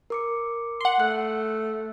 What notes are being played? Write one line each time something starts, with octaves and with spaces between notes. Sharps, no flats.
A#4 D6 C#7
F#5 C6
A3 F#6